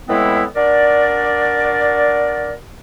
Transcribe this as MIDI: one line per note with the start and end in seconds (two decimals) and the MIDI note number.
0.08 0.44 45
0.08 0.44 52
0.08 0.44 56
0.08 0.44 59
0.08 0.44 60
0.08 0.44 64
0.56 2.54 62
0.56 2.54 66
0.56 2.54 70
0.56 2.54 74